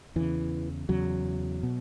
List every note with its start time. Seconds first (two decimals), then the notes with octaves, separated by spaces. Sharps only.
0.16 E2 C#3 E3
0.89 E2 C#3 F#3
1.63 B2